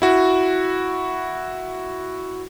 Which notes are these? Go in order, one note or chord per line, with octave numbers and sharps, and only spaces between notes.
E4 F#4